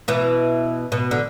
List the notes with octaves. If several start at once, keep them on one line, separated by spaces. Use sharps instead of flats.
B2 E3
B2
D3